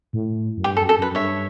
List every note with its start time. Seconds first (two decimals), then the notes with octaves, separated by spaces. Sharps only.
0.13 A2
0.57 F#2
0.64 G2 G4
0.77 A4
0.81 F#2
0.89 A4
0.98 F#2 B4
1.11 F#2
1.15 G2 C#5 E5